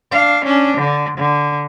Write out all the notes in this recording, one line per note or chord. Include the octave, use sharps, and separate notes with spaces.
D4 F5
C#4 D4
D3
D3